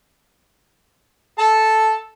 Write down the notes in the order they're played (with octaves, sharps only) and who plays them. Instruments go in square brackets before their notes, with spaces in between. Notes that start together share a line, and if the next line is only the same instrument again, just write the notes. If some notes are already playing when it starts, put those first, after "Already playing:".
[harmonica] A4 A5